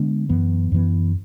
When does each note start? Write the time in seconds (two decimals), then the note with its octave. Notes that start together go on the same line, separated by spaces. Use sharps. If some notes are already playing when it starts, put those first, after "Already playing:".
Already playing: D3 G#3 B3 D4
0.29 F#2 E3 B3
0.72 F#2 E3 B3